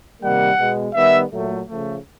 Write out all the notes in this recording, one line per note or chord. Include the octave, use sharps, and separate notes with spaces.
C3 D#3 G3 A#3 F#5
B2 G#3 B3
D#3 G3 B3 E5
A#2 F#3 A3
C#3 F3 A3